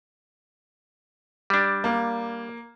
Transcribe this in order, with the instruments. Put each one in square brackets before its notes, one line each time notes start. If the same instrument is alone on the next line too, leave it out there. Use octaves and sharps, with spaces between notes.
[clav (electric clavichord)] G3 D4
[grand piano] A#3